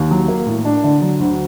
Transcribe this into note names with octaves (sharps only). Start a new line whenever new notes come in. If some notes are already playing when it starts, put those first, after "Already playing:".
Already playing: D#2
F#3
A#3
A2
D4
D3
F#3
D2